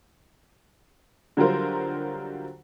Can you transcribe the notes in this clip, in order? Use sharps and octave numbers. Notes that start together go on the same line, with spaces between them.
D3 F#3 G3 F4 A#4 C5